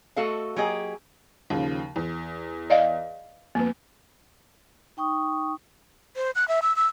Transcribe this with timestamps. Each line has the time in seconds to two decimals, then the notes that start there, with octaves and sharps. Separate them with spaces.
0.16 A3 F#4 A4 D#5 F5
0.56 F#3 A#3 G4 G#4 D#5
1.50 D#2 C#3 F3
1.96 E2
2.70 D5 D#5 F5
3.55 F2 A#3 B3
4.97 D#4 G5 C#6 D#6
6.16 C5
6.35 F#6
6.48 E5
6.62 E6
6.76 E6